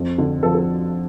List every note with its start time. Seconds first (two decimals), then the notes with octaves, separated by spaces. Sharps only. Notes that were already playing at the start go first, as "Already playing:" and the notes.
Already playing: F2
0.18 D3
0.43 F3 A4
0.55 A4